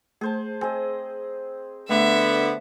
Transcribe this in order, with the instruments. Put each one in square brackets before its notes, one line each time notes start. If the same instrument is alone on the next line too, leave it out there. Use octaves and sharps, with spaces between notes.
[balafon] A3 [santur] G#4 C5 A5
[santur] C4 G#4 D#5 [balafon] G#5
[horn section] D3 B3 [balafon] A3 [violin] E5